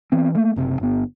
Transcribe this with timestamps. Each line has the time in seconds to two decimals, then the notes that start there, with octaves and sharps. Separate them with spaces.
0.12 E3 B3 C4
0.35 A3 A#3
0.56 F#1 C3
0.80 G1 B3